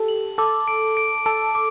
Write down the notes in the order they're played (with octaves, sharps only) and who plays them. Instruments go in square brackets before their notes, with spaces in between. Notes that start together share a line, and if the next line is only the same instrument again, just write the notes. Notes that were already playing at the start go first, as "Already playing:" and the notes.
Already playing: [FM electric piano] G4 A4
[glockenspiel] F#7
[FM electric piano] A4 [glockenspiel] D6
[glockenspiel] D7
D7
[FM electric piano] A4 [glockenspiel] D7
[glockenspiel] D6